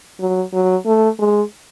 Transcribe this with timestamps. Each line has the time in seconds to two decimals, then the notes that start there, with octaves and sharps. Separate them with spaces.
0.20 F#3
0.53 F#3
0.86 A3
1.19 G#3